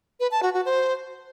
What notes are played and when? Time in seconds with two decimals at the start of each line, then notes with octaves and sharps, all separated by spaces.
0.20 B4
0.31 A5
0.43 F#4
0.54 F#4
0.65 C5